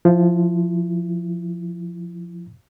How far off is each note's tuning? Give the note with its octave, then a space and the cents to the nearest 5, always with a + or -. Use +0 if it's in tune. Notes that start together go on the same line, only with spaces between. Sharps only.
F3 +0 E4 +25